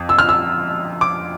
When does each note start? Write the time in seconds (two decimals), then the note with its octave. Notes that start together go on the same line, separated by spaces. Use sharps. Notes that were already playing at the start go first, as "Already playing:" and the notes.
Already playing: F2 F3
0.09 E6
0.18 F6
0.29 E6
1.01 D6